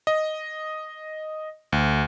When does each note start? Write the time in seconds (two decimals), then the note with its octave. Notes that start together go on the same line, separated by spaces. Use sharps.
0.07 D#5
1.72 D2